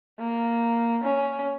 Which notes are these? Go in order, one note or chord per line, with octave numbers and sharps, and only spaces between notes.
A#3
C#4